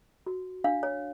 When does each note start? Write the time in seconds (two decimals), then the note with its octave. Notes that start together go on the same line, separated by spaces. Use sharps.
0.26 F#4
0.64 D4 F5
0.83 C#5